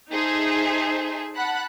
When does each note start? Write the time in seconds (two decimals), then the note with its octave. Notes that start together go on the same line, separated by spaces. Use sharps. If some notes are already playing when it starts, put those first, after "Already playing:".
0.12 D#4 G#4 A4 C5 E5
1.36 F#5 A5 B5 F#6